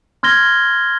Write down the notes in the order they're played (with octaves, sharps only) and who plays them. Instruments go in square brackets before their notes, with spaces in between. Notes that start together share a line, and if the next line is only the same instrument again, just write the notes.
[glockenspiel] C6 F6 G#6 A#6 G7